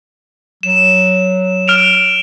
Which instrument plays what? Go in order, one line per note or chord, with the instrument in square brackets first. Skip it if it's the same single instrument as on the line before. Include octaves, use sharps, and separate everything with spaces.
[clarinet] F#3 [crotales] E7
[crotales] F6 D7 F7